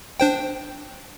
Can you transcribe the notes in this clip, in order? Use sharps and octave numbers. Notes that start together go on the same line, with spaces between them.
D4 C5 G5